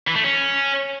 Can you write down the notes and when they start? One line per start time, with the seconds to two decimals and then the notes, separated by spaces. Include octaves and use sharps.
0.08 E3
0.16 A3
0.24 C#4